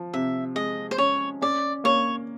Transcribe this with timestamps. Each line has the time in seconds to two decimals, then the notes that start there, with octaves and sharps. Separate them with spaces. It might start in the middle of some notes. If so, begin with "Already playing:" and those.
Already playing: F3
0.13 C3 E5
0.55 G#3 D#5
0.91 C5
0.98 C#4 C#5
1.42 C#4 D5
1.84 A#3 C#5